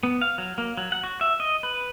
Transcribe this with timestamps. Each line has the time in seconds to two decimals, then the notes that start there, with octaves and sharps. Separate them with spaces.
0.03 B3
0.21 F5
0.38 F#3
0.58 A#3
0.77 F#3
0.92 F#5
1.03 F#4
1.21 E5
1.40 D#5
1.63 B4